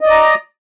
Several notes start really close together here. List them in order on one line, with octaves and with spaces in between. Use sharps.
D#5 D5 A#5